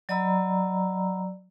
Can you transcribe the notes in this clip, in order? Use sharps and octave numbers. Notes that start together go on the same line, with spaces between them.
F#3 D5 D#5 A#5 B5 E6